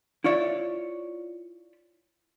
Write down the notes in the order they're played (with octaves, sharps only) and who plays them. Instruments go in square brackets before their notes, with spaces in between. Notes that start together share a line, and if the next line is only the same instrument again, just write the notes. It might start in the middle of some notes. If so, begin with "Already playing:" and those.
[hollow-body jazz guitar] E4 F4 C#5 D5 E5